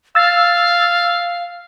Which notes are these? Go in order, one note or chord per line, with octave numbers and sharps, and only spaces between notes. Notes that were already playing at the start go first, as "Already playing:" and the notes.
F5 E6 A6